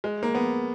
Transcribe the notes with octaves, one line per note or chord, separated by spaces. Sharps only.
G#3
A#3
B3